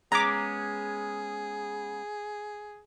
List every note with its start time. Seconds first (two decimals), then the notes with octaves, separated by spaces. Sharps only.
0.12 G#3 B3 C#4 G#4 A#5 D6